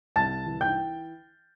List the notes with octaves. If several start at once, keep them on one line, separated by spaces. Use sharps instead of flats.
C2 A5 A6
E3
G5 G6